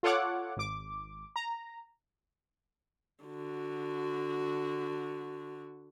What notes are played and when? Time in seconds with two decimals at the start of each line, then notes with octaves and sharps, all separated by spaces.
0.03 F4 A4 C#5 F#5 D6
0.57 G#1 D6
1.36 A#5
3.25 D3 F#4